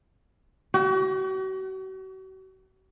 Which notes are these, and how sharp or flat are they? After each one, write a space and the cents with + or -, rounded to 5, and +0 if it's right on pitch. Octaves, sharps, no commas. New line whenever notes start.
F#4 +40